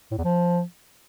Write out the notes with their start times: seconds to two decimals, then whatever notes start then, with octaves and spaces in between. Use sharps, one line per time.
0.11 A2
0.18 E2
0.24 F3